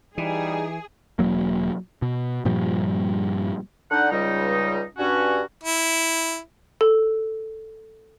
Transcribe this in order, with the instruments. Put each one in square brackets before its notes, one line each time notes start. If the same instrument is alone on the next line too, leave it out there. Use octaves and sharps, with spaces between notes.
[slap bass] E3 [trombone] G3 [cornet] D#4 [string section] G#4
[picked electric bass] E1 F#2 F#3 A#3
B2
G2 A#2 F3 G3
[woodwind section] D3 D4 D#4 F#5
C#2 G3 D#4
G2 C#4 F#4
[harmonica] E4
[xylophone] A4